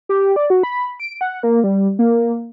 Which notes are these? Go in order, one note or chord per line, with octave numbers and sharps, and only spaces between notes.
G4
D5
F#4
B5
D7
F#5
A#3
G3
A#3